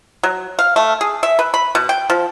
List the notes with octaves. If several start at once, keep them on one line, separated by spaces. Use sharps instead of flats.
F#3
F5
A3
G#4
E5
B4
B5
B2
G5
F3